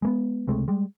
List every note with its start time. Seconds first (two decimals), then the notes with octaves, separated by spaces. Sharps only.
0.02 G#3 A#3 B3
0.48 C#2 C3 G#3 A3
0.68 G3 G#3